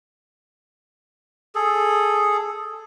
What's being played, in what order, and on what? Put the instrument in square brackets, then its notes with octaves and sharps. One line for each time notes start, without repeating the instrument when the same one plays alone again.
[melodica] G#4 A4